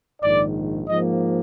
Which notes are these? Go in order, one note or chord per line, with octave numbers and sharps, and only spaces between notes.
A#1 G#2 D#3 D5
G#2 F3 A#3 D#5